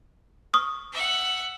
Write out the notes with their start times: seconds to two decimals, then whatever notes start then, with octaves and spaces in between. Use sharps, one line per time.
0.53 C#6 D#6 F6
0.93 E5 F#5